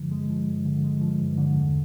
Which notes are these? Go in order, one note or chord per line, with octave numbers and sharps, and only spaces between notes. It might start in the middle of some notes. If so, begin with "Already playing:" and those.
Already playing: G2 D3 F3 G#3
G#3
F3
G2
D3
G#3
F3
G2
D3
E2